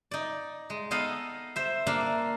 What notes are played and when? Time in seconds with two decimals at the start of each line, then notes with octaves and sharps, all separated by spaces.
0.11 D#4 D5
0.70 G#3
0.91 B3 D#4 A4 D#5 F5
1.56 C5 E5
1.87 A#3 D4 E5 F5